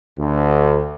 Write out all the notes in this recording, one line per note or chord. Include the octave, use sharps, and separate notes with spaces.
D2